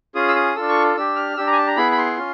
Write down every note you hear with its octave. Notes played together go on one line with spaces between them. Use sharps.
C#4 F4 G#4 D#6
E6
D#6
D4 F4 A4 E6
C#6
D4 G4 E6
F6
D4 G4 E6
A#5
G#5
A5
A#5
B3 E4 G#4 B5
B5
C6
C#4 F4